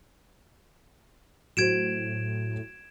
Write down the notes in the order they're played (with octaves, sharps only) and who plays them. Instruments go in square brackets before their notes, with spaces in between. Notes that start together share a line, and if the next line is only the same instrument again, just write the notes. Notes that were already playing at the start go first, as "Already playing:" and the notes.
[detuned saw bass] A2 [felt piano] F#3 F#4 C5 [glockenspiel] G#6 D7 E7